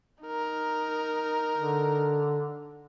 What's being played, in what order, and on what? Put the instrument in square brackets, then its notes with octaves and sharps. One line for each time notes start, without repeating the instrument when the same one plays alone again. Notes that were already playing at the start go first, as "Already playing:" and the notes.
[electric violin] D#4 A#4
[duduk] D3